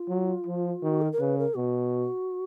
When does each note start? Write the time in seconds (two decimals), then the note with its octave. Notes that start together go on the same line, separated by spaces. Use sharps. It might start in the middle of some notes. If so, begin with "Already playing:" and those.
Already playing: F4
0.09 F#3
0.47 F3
0.83 D#3 F#4
1.01 A#4
1.13 A#4
1.20 C#3 B4
1.39 A#4
1.56 B2 F#4